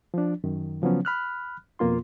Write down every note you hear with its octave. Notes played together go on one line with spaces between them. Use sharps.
F3 D4
F#2 D#3
C#3 F3 F#3 B3 C#4
B5 F6 F#6
F2 B2 A#3 F4 C6